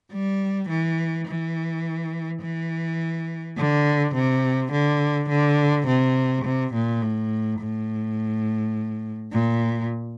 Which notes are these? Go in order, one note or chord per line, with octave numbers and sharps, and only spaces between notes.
G3
E3
E3
E3
D3
C3
D3
D3
C3
C3
A#2
A2
A2
A#2